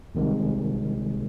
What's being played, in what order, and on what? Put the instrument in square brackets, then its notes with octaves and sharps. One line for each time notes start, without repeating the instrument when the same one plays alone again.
[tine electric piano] C2 C3 D#3 G#3